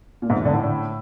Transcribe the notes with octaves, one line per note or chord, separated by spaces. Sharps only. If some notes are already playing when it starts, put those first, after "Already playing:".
A#2
G#2
E2
D3
A2